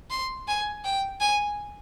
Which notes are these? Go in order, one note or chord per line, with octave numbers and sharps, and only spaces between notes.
C6
G#5
G5
G#5